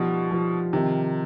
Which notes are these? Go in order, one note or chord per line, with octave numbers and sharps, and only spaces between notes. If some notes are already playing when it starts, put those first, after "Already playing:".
Already playing: B2 F3 G3 D#4
F3
C3 D#3